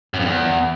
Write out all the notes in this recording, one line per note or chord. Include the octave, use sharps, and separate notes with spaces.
F#2
F2
E2